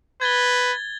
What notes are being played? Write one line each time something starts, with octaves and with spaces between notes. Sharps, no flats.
B4 G#6 A6 G7